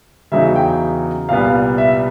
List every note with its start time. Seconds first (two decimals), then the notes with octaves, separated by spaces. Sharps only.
0.32 E2 C#3 F#3 B3 D#4 E5
0.56 G5
1.29 C2 A#2 G3 B3 F5
1.78 E5